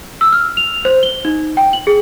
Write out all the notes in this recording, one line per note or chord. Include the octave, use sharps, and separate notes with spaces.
E6
F6
F7
C5
G7
D#4
G5
F#7
G#4